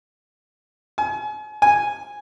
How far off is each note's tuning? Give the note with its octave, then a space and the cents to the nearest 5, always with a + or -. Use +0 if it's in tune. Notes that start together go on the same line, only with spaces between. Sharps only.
G#5 +35
G#5 -5